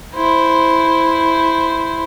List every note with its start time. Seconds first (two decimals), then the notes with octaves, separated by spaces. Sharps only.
0.14 E4 C5